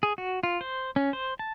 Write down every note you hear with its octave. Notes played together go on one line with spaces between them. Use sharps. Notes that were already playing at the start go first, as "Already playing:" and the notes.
G#4
F#4
F4
C5
C#4
C5
A5